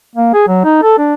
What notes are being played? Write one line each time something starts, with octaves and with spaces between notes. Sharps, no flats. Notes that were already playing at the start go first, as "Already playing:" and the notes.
A#3
G#4
F#3
D#4
A4
D4